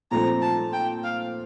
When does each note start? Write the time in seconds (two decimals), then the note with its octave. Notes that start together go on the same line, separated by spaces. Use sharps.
0.11 A#2 F3 A3 C4 A#5
0.42 A5
0.73 G5
1.04 F5